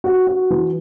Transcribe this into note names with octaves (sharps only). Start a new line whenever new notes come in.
F#4
F#4
E3